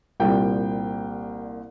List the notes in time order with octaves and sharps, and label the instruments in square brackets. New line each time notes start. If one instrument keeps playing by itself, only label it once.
[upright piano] C2 A#2 G3 C4 G5